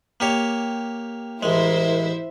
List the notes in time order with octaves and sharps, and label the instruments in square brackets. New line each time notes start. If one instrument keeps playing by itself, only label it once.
[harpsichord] A#3 G4 C#5
[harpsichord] A1 G#3 [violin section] E4 C5 E5 [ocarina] A#4